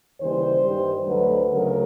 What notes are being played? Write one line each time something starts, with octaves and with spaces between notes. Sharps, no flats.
D#2 C#3 E3 G3 C5
G2 D#3 G3
D2 D3 F#3 A3 B4
D2 C#3 F#3 A3 A#4